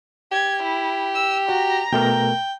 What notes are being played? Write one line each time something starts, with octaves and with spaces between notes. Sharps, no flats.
G4 G#6
E4
E6
F#4 A#5
B2 A3 A#4 G5